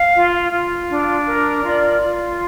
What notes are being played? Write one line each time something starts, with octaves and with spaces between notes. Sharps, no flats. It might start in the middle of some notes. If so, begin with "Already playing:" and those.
Already playing: F5
F4
F4
D4
A#4
F4 D5
F4